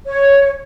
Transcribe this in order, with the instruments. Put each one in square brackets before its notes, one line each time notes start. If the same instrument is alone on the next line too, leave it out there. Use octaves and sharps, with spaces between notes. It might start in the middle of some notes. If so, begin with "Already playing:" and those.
[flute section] C#5